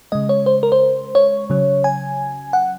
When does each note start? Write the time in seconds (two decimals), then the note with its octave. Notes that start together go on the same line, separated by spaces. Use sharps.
0.12 C#3 G#3 D#5
0.29 C#5
0.46 C5
0.63 A#4
0.72 C5
1.15 C#5
1.50 C#3 F#3
1.84 G#5
2.53 F#5